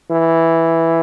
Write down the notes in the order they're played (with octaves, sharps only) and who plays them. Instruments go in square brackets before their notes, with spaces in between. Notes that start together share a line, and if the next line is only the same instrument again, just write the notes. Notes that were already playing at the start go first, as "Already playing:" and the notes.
[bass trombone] E3